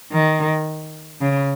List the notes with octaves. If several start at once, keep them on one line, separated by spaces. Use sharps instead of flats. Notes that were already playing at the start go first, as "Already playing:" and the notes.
D#3
C#3